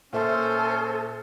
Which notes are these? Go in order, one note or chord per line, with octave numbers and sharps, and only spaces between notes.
A#2 C#4 A4 C5 E5 C6